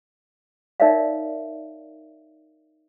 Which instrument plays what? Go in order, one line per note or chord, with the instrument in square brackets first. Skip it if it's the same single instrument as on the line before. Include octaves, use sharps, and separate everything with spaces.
[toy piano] D#4 A#4 C#5 D5 E5 F5